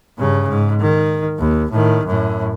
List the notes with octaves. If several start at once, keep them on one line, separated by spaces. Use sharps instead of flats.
G2 C#3
G#2
D#3
D#2
A2 D#3
F#2 A2